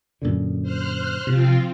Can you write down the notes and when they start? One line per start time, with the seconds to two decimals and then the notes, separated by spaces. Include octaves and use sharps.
0.22 F#2 A#2 D3
0.63 C5 F6 F#6
1.27 C3 F3 C4 F4